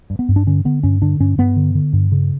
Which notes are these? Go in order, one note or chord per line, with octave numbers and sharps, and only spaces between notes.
G2
B3
G2
D4
D3 C#4
D3 B3
G2 C#4
D3 D4
G2 C#4
G2 B3
D3
D3
G2
C#3